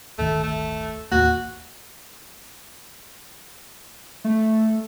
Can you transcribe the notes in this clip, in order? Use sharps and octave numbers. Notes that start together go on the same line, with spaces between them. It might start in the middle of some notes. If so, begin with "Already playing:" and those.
D1 G1 D#3 A3
A3
A1 D#2 A#3 F#4
A3